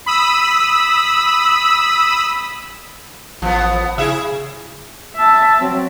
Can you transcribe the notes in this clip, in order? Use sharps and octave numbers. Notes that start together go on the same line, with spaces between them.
B5 D#6 E6
A1 F3 B3
C#3 E4 G#4 E5
E5 A5
F#3 C4